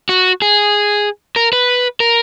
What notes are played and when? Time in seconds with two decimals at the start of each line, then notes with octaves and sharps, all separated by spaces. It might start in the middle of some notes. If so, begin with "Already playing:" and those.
0.09 F#4
0.42 G#4
1.36 A#4
1.53 B4
2.00 A#4